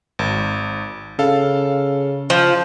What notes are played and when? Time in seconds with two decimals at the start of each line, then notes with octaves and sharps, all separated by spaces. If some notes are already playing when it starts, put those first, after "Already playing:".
0.19 G#1
1.19 C#3 A4 F5
2.30 F3